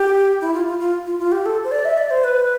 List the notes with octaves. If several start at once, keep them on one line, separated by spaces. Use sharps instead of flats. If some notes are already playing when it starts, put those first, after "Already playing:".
Already playing: G4
E4
F4
F4
F4
F4
F4
G4
A4
C5
D5
E5
D5
C5
B4